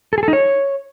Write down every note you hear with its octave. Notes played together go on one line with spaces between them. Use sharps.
A4
G#4
A4
D#4
C#5